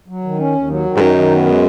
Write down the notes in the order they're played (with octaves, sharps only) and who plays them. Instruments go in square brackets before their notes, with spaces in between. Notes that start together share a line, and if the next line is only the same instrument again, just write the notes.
[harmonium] F#3
D#3
C#4
D#2
F#3
D#3
[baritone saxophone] G#2
[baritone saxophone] F#2 [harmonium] D#4
[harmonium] D#3
B3
G#3